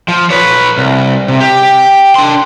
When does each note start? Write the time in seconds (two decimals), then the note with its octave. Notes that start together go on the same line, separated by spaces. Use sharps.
0.08 F3
0.30 B4 C#5
0.78 C2
1.28 C3
1.41 G4
2.16 D4 C6